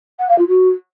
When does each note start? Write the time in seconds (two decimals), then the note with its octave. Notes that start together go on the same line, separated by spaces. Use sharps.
0.19 F#5
0.28 F5
0.38 F4
0.48 F#4